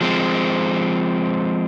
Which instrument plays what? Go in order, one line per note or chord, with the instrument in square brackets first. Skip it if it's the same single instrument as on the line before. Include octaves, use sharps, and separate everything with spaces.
[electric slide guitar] F3 G#3 C4